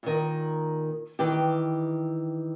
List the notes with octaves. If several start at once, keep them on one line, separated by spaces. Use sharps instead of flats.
A#2 D#3
D#3 E3 G4